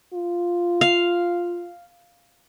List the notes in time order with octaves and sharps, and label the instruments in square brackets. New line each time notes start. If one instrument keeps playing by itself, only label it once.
[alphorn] F4
[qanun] F5